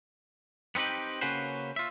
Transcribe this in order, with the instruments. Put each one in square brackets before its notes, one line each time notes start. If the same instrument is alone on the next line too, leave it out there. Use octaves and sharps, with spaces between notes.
[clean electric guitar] B3 C4 D#4 G4 B4
C#3 A#3 C#4 F#4 B4 C5
F4 E5